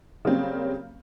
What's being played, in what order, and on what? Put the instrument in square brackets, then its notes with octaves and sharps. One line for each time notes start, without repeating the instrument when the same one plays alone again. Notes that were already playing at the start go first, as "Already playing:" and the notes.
[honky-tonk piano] C#3 F#3 G3 A#3 C4 C#4